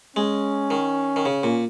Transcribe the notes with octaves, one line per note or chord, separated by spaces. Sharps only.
G#3 C#4
D#3
D#3
C#3
A#2